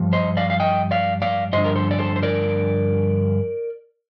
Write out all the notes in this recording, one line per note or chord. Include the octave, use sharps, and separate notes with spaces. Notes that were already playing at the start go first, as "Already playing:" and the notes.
Already playing: G2 F3
C5 D#5
D5 F5
F5
D#5 G5
D5 F5
D5 F5
G2 D3 F3 C5 D#5
A#4
A4 C5
D5
A4 C5
C5
A#4 D5